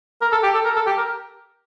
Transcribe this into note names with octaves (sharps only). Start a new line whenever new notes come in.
A#4
A4
G4
A4
A#4
A4
G4
A#4